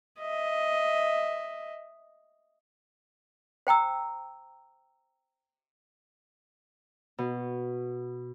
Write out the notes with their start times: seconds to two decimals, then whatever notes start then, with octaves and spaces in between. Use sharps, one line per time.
0.19 D#5 E5
3.67 C5 G5 A#5 E6
7.18 B2